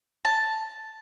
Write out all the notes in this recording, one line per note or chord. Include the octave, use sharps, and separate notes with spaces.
A5